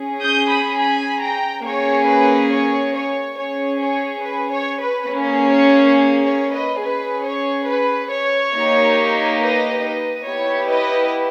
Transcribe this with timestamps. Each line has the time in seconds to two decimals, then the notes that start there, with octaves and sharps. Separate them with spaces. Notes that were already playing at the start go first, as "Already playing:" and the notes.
Already playing: C#4 G#4
0.21 D#6 G6
0.50 B5 D#6
0.79 G#5 B5
1.22 G5 A#5
1.65 A#3 C#4 G#4 C#5
2.07 B4
2.50 C#5
2.94 C#5
3.36 C#4 G#4 C#5
3.80 C#5
4.23 B4
4.52 C#5
4.80 B4
5.09 A#3 C#4 G#4
5.51 C#5
6.24 C#5
6.52 B4 D#5
6.81 C#4 G#4 B4
7.24 C#5
7.66 B4
8.10 C#5
8.53 A#3 D#4 G4
9.39 B4 D#5
9.82 B4 D#5
10.25 B3 E4 G4 C#5
10.68 B4 D#5